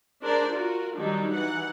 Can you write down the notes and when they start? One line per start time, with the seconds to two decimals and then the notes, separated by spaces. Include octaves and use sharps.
0.22 D4 G#4 A#4 C5 D5
0.51 F4 F#4 A#4
0.96 D#3 F#3 G3 D4 D#4
1.31 E3 D#4 F#5